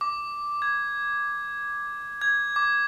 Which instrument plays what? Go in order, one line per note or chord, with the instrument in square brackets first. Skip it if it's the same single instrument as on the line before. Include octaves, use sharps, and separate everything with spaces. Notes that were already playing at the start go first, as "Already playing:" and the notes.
[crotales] D6
G#6
G#6
D6